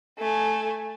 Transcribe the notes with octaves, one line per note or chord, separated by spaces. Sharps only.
A3 G#5